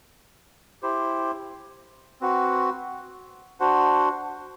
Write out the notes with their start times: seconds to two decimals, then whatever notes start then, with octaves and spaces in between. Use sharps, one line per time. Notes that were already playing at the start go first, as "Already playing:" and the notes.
0.83 E4 G4 C5
2.21 C4 F#4 B4 F#5
3.60 D4 F#4 C5 F#5